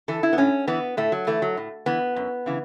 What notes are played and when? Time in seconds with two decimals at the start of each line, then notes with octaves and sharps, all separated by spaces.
0.08 E3 A4
0.23 E4
0.33 B3
0.38 A2 C#4
0.67 E3 B3
0.97 A2 A3
1.12 F#3
1.27 E3 A3
1.42 F#3
1.57 A2
1.86 E3 B3
2.16 F#2
2.46 C#3 E3